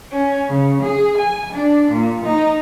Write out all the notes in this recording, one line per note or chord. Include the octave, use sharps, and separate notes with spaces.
C#4
C#3
G#4
G#5
D4
A#2
D#4